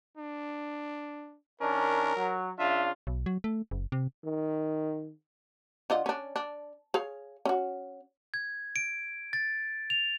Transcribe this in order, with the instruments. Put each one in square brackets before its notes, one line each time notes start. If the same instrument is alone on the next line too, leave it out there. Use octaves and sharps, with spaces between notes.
[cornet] D4
[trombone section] D#3 C#4 D4 [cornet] A#4
[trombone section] F#3
[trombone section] C#3 D4 F4 [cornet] E5
[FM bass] B1
F#3
A3
F#1
C3
[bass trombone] D#3
[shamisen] D3 F4 D#5
C#4 D4
D4
G#4 C#5 F5
C#4 F#4
[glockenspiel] G#6
D7
A6
F7